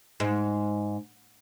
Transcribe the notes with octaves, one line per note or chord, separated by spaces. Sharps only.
G#2